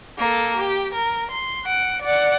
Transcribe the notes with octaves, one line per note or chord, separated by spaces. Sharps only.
A#3 A4
G4
A#4
C6
F#5 D7
D5 F#5